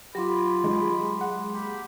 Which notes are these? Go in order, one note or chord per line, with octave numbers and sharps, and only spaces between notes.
F#3 F4 G4 B5 C6 D6
G#3
F#5
A#3 G4 B5